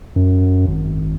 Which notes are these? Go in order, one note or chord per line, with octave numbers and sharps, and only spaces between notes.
F#2
G#1